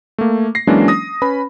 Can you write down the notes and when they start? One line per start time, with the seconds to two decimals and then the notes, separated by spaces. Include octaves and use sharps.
0.18 A3 A#3
0.55 A#6 C7
0.67 E3 F#3 G#3 A#3 C#4 D4
0.88 D#6 A#6
1.22 C#4 B4 B5